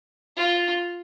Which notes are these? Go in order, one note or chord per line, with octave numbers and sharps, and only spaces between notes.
F4